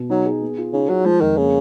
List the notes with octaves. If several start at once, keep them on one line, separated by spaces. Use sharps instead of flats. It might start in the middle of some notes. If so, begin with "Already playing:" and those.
Already playing: B2
F#3 D#4
G#4
B3
F4
C#3 D#4
F#3 G#4
F3 G#3
F2 D#3
C#3 A#3